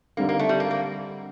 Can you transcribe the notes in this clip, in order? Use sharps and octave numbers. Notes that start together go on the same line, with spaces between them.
D3 G3 A#3 C4 D#4
A#3
A3
G3
A#3
A#3